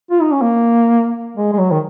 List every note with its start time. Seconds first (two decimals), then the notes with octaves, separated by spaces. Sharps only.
0.11 F4
0.21 D#4
0.32 C#4
0.42 A#3
1.37 G#3
1.53 G#3
1.59 F#3
1.72 D#3